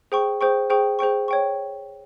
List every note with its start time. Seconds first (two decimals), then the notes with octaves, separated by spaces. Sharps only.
0.12 G#4 C5 G5 C#6
0.41 G#4 C5 G5 C#6
0.70 G#4 C5 G5 C#6
0.99 G#4 C5 G5 C#6
1.28 C#5 G5 C#6